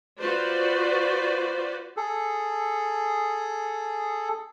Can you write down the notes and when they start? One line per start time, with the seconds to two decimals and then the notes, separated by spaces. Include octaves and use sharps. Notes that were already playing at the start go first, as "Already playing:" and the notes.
0.19 F4 F#4 B4 C5 D5
1.97 G#4 A4